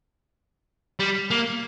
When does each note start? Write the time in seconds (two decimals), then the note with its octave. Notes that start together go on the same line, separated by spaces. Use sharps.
1.00 G3
1.31 A#3